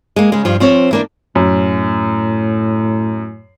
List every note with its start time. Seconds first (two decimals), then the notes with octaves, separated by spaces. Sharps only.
0.16 G#3 A#3
0.32 C#3 G#3
0.45 G2 F3
0.60 F3 C4 C5 C#5
0.91 E3 A#3 D4
1.35 F#2 A2